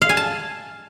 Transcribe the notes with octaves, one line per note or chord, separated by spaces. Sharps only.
F5
G#5
A5